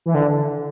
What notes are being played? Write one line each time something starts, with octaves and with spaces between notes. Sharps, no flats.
E3
D3